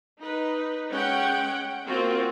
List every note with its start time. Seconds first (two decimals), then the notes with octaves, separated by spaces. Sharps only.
0.22 D#4 B4
0.91 G#3 C#4 F#5 G5
1.85 A#3 C4 F4 F#4